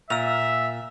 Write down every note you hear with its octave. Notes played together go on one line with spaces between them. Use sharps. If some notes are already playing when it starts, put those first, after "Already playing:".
A#2 E5 E6 F7